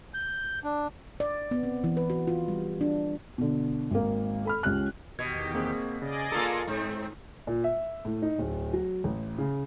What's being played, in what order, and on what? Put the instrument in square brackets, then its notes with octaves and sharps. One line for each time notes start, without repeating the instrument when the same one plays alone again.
[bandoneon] G6
D4
[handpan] D5
B3
C4
E3
B4
F#4
F4
G3
D4
[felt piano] B2 D3
G#1 A#3
A4 B5 F6
C#2 C#4 G4 F#6
[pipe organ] E2 D#3 G4 [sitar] B2 [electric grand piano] G#6
[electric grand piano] A#3 C4 G#4
[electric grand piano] C#3 [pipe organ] G#4 D5 D#5
[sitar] A#3 F4 A4 [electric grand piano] A#5
[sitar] G#2 [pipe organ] C4
[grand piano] A#2
E5
A2
D#4
D1
F#3
A1
C#3